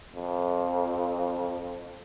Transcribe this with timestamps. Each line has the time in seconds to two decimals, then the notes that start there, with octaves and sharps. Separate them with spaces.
0.15 F2